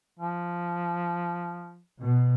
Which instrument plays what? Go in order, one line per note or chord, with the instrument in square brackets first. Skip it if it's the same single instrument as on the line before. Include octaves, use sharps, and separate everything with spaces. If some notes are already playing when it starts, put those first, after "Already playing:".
[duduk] F3
[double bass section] B2